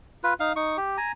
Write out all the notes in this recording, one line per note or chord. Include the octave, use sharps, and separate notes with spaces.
F4 B4
D#4 F5
D#4 C#6
G4
G#5 A#5